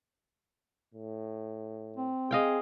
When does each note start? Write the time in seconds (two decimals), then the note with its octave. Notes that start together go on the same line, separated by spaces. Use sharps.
0.94 A2
1.96 C4
2.31 G#4 D#5 F5 G5